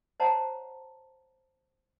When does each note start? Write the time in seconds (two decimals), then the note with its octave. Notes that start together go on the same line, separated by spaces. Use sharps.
0.20 C5 C#5 D#5 F#5 A5 A#5